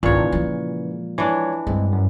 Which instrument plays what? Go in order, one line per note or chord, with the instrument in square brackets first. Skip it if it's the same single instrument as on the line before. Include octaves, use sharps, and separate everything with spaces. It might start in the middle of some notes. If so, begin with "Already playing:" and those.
[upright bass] G#1 D2 [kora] A#2 C#5 [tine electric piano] C#3 E3
[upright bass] F3 G#3
[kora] E3 D4 [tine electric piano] C#5 D5
[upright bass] G2 [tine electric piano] G#3 C4
[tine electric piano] F#2